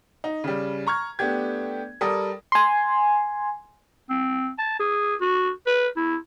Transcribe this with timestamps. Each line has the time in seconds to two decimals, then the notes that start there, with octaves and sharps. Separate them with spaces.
0.24 D#4
0.44 C#3 G3
0.87 A#5 C#6 F6 G#6
1.19 A3 B3 D4 G4 G#6
2.01 G3 A4 A#4 D#6
2.52 G#5 C6
4.09 C4
4.58 A5
4.79 G#4
5.21 F#4
5.66 B4
5.96 E4